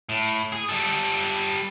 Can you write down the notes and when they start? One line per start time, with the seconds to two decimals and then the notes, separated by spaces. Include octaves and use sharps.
0.09 A2
0.53 G#4
0.69 G3 A4